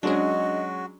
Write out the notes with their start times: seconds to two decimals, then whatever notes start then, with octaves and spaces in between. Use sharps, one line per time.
0.03 F#3 G#3 C#4 D4 F#4 G#4 D#5